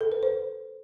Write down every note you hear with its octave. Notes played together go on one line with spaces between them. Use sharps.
A4
B4
C5